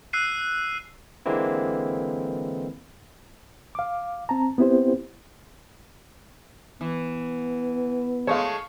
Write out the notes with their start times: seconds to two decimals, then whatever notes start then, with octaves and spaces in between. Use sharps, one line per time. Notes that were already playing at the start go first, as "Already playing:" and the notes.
0.13 E6 F#6 C7 D#7
1.26 D3 E3 G#3 A#3 C4 E4
3.75 F5 D6
4.29 C4 A5 A#5
4.58 B3 C4 E4 G4 C5
6.81 E3 B3
8.27 G#3 A3 C#5 F5